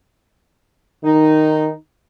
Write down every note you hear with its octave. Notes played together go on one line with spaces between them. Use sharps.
D#3 D#4